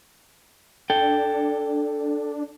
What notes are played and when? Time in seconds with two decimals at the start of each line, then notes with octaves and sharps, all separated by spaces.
0.90 D4 A4 G5